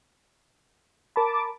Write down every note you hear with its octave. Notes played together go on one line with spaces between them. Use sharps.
A#4 A5 B5 D6